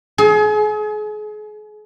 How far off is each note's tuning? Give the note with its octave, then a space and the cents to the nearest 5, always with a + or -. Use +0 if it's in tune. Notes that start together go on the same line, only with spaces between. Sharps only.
G#4 +35